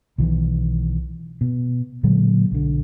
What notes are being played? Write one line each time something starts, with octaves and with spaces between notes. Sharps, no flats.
B1 D#3 E3
B2
A#2 D3 F#3 G#3
B1 D3